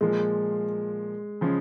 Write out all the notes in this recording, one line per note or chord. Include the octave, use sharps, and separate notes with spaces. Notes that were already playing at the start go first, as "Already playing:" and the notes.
A#2 F3 G#3 A#3
C#3 F3 G#3 C#4